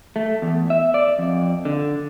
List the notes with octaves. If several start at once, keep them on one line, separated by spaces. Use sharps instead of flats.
A3
E2
E5
D5
F2
D3